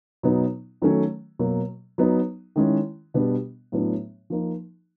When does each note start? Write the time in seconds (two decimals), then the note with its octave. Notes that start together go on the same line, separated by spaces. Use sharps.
0.23 B2 F#3 B3 D#4
0.82 D#3 F#3 A3 C#4
1.39 B2 F#3 A#3
1.98 F#3 B3 D#4
2.56 D#3 G#3 C#4 E4
3.14 B2 G3 B3 D4
3.72 A2 F#3 B3 D4
4.30 F3 A#3 D#4